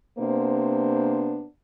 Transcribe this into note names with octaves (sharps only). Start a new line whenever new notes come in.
C3 A#3 B3 D4 C5